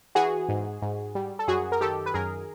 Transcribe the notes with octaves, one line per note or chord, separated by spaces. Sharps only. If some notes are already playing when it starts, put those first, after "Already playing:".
E3 F#4 G#4
G#2
G#2
G3
A4
F#2 F#4 G#4
A#4
D#3 G4 A4
B4
F#2 G#4 A#4